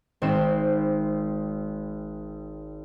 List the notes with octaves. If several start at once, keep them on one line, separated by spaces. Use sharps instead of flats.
G#1 C4 E7